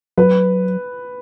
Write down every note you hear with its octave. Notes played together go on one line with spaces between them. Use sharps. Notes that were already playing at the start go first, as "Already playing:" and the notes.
F#3 B4